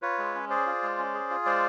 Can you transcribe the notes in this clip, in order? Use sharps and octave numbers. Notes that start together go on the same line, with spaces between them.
F4 B4 C#5
G#3
C#4
G#4 C5 D5
F4
G#3
C#4
G#4
F4
G#3 C5 D5